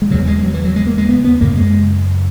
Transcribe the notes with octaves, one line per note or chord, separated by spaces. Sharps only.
G#3
E2 C#3 F#3
G#3
F#3
E3
F#3
G#3
A#3
G#3
B3
B3
F#2 C#3 A#3
G#3